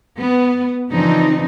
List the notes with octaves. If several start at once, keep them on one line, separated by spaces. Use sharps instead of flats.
B3
C#3 E3 F3 C4 D4 D#4